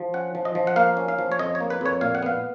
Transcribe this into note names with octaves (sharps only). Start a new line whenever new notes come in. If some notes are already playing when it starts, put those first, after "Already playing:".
Already playing: F3
C#4 F#5
F3
D#5
F3
F#5
A#3 F5
C#4
F5
F3
C#5
F2 D#5
C#5
A#3
B4
F2 C#5
A#2 F5
F#5
B3 F5